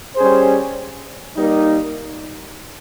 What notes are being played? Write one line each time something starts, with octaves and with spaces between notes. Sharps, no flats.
G3 C#4 G#4 C5
G3 A#3 D#4